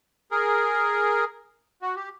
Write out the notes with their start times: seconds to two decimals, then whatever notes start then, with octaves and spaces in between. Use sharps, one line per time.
0.31 G#4 A#4
1.82 F#4
1.96 G4